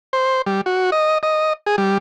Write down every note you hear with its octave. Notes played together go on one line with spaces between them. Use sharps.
C5
G3
F#4
D#5
D#5
G#4
G3